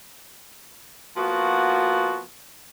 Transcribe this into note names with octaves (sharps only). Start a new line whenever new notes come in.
F3 A#3 B3 F#4